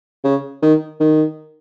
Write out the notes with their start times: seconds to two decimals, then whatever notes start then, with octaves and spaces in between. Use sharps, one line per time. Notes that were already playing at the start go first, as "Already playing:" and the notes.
0.24 C#3
0.62 D#3
1.00 D#3